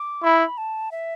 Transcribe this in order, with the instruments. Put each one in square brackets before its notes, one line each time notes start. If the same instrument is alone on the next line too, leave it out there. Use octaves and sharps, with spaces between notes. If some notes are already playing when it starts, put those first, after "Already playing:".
Already playing: [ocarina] D6
[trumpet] E4 [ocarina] B5
[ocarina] A5
E5